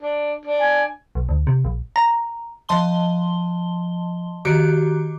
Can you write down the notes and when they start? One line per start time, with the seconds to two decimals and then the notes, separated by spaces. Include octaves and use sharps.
0.01 D4
0.45 D4
0.59 G#5
1.15 B1
1.29 D2
1.47 C3
1.65 A#1
1.96 A#5
2.69 F3 D#5 A5 C6 G7
4.45 D#3 F#4 G4 D6